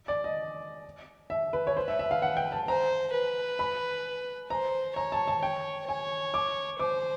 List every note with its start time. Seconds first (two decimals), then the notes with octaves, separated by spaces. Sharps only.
0.08 D5
0.24 D#5
1.30 E5
1.53 B4
1.67 C#5
1.76 B4 C5
1.88 E5
1.99 E5
2.11 F5
2.22 F#5
2.37 G5
2.52 A5
2.67 C5 A#5
3.14 B4
3.59 B5
4.50 C5 A#5
4.96 C#5 A#5
5.12 A5
5.28 A5
5.42 C#5 G5
5.87 C#5 G#5
6.34 D6
6.79 C5 D6